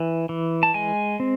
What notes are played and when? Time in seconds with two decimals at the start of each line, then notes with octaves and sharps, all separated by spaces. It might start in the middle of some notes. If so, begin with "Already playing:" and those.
Already playing: E3
0.29 E3
0.63 A5
0.74 G#3 G#5
1.20 C4